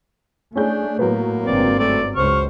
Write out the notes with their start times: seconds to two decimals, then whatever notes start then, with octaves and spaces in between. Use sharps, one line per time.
0.56 A3 C#4 D4 G#4 G6
0.99 A2 F#3 A#3 B3
1.46 G1 G#2 C4 D5
1.79 A3 D5
2.16 C#2 C5 C#6 F6